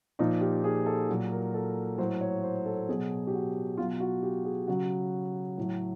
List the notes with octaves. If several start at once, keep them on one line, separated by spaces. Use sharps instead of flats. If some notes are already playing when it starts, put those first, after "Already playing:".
A#2 F3 D#4
G4
G#4
A4
A#2 F#3
A#4
A4
A2 F#3 C5
C#5
C5
A4
B2 F#3 G#4
G4
F#4
B2 F#3 F4
F#4
G4
G#4
C#3 F#3 F#4
A2 F#3